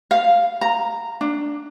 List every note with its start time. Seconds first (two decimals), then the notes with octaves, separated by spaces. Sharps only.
0.11 F5
0.61 A#5
1.21 D4